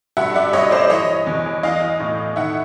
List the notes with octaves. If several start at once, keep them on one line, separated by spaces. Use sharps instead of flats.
G2 E5 F#5
D5 E5
G2 C#5 D#5
C5 D5
E3 C#5 D#5
E2
E3 D#5 F5
A2
D#3 E5 F#5